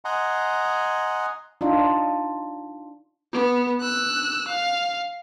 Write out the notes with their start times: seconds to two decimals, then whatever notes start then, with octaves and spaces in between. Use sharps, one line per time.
0.05 D#5 F#5 G#5 A#5 C6
1.61 D4 D#4 F4
3.33 B3
3.81 E6 F#6
4.48 F5